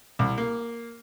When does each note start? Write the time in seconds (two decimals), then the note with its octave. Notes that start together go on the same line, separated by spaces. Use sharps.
0.19 C2
0.38 A#3